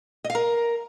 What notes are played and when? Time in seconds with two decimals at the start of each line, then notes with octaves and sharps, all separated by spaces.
0.24 D#5
0.30 F5
0.35 A#4